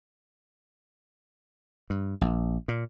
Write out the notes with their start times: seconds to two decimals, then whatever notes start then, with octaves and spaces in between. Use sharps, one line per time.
1.90 G2
2.21 A#1
2.68 A#2